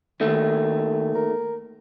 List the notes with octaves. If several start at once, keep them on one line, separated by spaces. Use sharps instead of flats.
D#2 D#3 A3
A#4